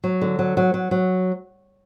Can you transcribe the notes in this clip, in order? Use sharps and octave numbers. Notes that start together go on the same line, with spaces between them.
F#3
D3
F#3
F#3
F#3
F#3